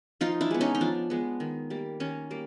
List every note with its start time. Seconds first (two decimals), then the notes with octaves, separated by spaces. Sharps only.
0.21 F3 D#4 F4
0.41 D4 E4
0.51 G#3 B3
0.61 C#4 D#4
0.75 D#4
0.81 F3 D4
1.10 G#3 B3
1.40 D#3
1.70 G3 A#3
2.00 D#3 C#4
2.30 G3 A#3